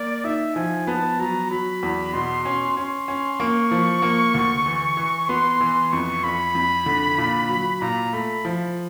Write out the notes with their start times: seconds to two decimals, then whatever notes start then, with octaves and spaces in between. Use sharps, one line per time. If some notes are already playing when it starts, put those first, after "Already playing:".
Already playing: A#3 D5
0.24 D#4 E5
0.55 F3 G#5
0.87 B3 A5
1.19 F#3 A#5
1.51 F#3 B5
1.83 E2
2.14 B2 C6
2.45 C#4
2.77 C#4 C6
3.08 C#4
3.40 A#3 C#6
3.71 F3
4.02 A#3
4.34 D2
4.66 E3
4.97 E3
5.28 B3 C6
5.61 E3
5.92 F2 C#6
6.24 F2 B5
6.55 F2
6.86 D3
7.18 A#2
7.49 F#3
7.81 A#2 A#5
8.13 A3 B5
8.45 F3